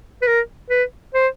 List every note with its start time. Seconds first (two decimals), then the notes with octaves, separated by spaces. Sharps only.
0.22 B4
0.27 A#4
0.70 B4
1.14 C5